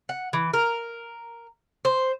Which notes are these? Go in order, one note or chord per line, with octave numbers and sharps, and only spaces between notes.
F#5
E3
A#4
C5